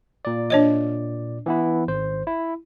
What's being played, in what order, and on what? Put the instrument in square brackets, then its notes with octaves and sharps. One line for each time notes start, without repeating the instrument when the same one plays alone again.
[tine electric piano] A#2 D5
[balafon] D4 C#5 D#5
[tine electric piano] E3 B3 E4
G#1 C5
E4